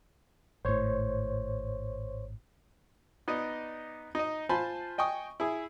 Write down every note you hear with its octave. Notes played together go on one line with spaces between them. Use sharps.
G#1 A2 C5 C#5
B3 D#4 D5 D#5
D#4 D#5
F4 C5 G#5 A5 B5
D#5 G5 G#5 C#6 D#6
E4 G#4